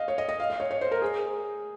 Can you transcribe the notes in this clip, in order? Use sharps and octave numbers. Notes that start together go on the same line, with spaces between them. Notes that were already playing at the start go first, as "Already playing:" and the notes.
Already playing: D#5 F5
C#5
D#5
D#5
F5
D#5
C#5
C#5
C5
A#4
G#4